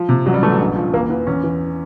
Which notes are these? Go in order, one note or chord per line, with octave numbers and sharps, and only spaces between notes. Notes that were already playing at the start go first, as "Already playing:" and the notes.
Already playing: F3
C3
A1 F#3
G3
E3 A3
F#3
A#1
F3
E2 A#3
E3 B3
E2 C#4
E3